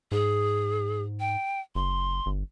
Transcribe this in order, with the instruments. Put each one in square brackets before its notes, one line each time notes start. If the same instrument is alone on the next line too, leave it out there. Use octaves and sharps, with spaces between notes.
[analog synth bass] G#2 [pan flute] G#4
[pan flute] G5
[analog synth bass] F#1 [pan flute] C6
[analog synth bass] G1